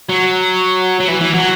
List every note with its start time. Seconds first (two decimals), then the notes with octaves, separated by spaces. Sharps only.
0.09 F#3
1.00 F#3
1.08 E3
1.21 E3
1.34 F#3